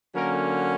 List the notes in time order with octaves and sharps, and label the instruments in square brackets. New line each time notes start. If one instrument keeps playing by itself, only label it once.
[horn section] D3 F#3 A#3 C#4 A#4